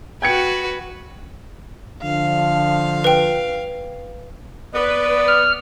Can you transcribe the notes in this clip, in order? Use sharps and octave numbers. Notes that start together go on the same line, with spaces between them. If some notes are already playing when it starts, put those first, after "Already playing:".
F#4 B4 G5 G#6 C#7
D3 F3 F5
B4 G5
B3 B4 D5
F6